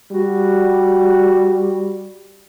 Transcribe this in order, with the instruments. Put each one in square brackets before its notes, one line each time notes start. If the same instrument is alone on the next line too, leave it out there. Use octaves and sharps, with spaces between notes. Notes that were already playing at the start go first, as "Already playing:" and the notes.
[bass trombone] G3 [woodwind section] F#4